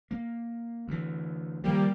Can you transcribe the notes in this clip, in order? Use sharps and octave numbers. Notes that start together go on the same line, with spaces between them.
A#3
D2 E3
D#3 F3 G3 A#3 G4